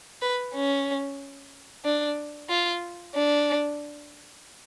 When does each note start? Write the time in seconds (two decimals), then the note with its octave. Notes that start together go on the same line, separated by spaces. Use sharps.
0.22 B4
0.54 C#4
1.85 D4
2.49 F4
3.14 D4